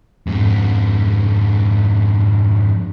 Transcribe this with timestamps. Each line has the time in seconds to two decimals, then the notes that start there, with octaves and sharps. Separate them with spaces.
0.27 F2 G#2